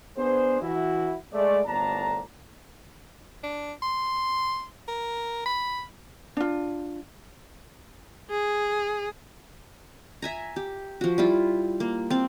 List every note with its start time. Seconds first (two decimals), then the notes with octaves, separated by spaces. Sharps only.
0.17 B3 D4 G#4 C5
0.62 E3 E4 F#4
1.33 G#3 A3 D5
1.66 G1 C2 A2 D4 A5 A#5
3.44 D4
3.82 C6
4.88 A#4
5.46 B5
6.37 D4 F4
8.30 G#4
10.22 E5 G#5 A#5
10.56 G4
11.01 F3 F#4
11.18 G3 E4 F4
11.80 A#3
12.10 C4 F5